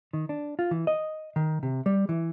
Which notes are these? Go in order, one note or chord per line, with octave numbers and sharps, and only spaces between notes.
D#3
D4
F4
E3
D#5
D#3
C3
G3
E3